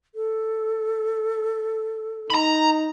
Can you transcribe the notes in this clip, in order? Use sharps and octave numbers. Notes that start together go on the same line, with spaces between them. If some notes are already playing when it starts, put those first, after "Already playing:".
A4
D#4 A#5 B5